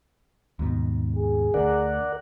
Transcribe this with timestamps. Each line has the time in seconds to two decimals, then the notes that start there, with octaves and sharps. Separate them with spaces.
0.59 D#2 G#2 B2
1.16 G#4
1.54 D2 D3 A#4 D5 F#5